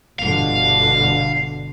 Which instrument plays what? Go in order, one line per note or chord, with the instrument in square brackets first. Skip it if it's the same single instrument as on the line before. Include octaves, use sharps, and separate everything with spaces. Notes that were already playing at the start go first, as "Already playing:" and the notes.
[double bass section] G1 B2 D3 [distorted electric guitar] F5